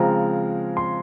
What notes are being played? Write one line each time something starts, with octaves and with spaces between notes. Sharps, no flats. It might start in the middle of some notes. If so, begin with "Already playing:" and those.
Already playing: C#3 F3 G#3 C4 A#5
C6